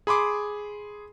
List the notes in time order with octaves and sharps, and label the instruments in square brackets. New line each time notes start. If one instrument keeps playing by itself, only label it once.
[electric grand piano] G#4 B5 C6 D6